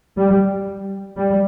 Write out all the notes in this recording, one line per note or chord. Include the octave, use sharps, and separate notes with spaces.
G3
G3